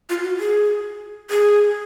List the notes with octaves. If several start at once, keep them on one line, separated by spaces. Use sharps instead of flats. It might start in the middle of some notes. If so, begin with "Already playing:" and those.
F4
F#4
G#4
G#4